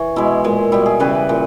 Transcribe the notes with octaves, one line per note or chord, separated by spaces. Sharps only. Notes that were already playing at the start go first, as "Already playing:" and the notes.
Already playing: E3 C#5
B2 G#3 E4
A#2 G#3
B2 G3 E4
G#4
C#3 E3 G3 B4
A#2